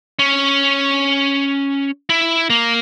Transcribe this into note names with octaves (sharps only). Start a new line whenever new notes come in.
C#4
E4
A#3